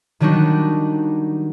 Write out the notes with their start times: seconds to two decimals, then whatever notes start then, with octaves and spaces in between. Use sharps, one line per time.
0.20 D#3 F#3 G3 D4 D#4 F#4